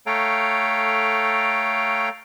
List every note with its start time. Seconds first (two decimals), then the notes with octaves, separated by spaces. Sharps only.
0.06 A3 A4 C#5 F5 G5 A#5